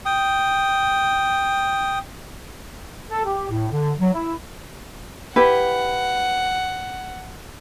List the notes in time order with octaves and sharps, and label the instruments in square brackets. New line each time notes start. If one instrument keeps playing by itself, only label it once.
[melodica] G5 D#6
[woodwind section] A4
G4
A2
D3
F#3
E4
[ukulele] E4 G4 B4 [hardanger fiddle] F#5